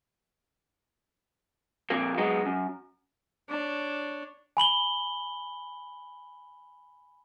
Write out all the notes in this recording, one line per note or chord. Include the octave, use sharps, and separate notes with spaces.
F2 A#2 A#3
F#3 G#3 B3 D#4
F#2
D4 C#5
G#5 B5 F#7 G7